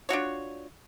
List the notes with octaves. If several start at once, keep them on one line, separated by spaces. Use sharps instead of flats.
D4 F4 F#4 C#5